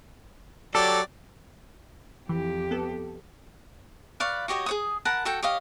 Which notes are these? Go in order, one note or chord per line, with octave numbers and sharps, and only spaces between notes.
F#3 G4 A4 D5
F2 E3 G4
B3 A4
B4 D5 F5 C#6
F#4 G4 C#5 D#5
G#4 C#5 D#6
A#4 F#5 A5 B5
F#4 A4 G5
G4 C#5 D#5 F5